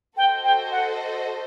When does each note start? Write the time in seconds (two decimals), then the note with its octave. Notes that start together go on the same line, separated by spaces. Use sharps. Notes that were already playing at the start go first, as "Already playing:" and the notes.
0.17 F#4 A4 C5 D#5 G5
0.44 G5
0.71 F#5